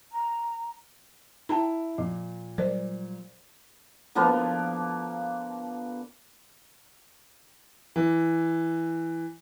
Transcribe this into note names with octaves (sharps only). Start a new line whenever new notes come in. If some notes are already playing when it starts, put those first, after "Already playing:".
A#5
E4 G5 A5 A#5
A#2 F3
F#3 G3 A#4 C5 D5
D3 F3 A#3 B3
E3